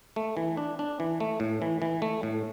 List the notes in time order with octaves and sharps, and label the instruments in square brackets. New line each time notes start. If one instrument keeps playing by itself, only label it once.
[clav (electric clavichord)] A3
E3
D4
D4
E3
A3
A2
E3
E3
A3
A2